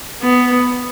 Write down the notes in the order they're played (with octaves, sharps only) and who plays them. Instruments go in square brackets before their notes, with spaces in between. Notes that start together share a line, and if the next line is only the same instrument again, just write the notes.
[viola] B3